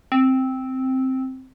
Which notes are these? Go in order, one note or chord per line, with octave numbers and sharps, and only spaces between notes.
C4